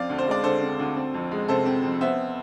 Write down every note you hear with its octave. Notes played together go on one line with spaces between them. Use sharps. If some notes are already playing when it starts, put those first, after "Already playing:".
Already playing: F2 C4 D5 F5
D2
C5
G#3 D5
D3 A4 C5
C4
D2
C4
F2
G#3
C3 A4 C5
C4
F2
B3 C5 E5